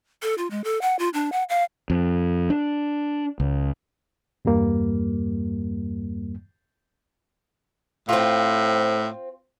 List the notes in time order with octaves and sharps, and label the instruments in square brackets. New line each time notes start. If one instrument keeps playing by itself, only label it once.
[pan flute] A4
F4
G#3
A4
F#5
F4
D4
F#5
F5
[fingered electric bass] F2
D4
C#2
[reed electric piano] E2 G2 G3 A#3
[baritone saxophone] A2 [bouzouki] C4 F4